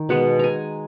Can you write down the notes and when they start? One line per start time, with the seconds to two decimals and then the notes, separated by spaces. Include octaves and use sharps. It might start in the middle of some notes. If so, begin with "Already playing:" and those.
Already playing: D#3
0.09 B2 G#3 B3 F#5
0.39 G#5 A#5